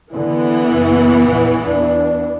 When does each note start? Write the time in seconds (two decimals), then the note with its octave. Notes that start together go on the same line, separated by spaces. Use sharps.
0.13 D3 E3 B3
0.70 F#1
1.25 A#1 E2
1.62 E2 D4